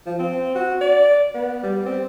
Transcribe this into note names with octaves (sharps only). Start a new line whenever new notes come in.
F3
C4
F#4
D5
B3
G3
C4